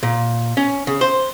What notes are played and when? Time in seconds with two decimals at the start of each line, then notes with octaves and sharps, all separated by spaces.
0.03 A#2
0.57 C#4
0.87 C#3
1.01 C5